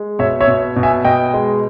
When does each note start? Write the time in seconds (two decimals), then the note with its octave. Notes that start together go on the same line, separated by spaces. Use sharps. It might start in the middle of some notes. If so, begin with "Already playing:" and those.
Already playing: G#3
0.19 B2 C#5 E5
0.40 C#5 E5
0.48 B2
0.76 B2
0.83 E5 G#5
1.05 B2 D#5 G5
1.34 G#3